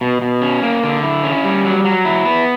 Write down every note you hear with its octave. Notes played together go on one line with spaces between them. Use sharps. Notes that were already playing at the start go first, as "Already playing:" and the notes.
B2
B2
C#4
A#3
D3
E4
C#4
G3
F#3
F#3
E4
B3